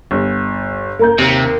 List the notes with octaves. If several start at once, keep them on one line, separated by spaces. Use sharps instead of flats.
G1
A#3 A#5 G6
D#2 C3